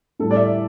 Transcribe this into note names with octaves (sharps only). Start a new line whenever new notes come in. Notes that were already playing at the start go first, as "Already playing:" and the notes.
A2 G3 A4
D5
E5